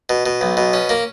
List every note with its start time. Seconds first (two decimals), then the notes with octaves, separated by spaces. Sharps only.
0.09 B2
0.26 B2
0.41 B1
0.57 B2
0.73 C#4
0.89 A#3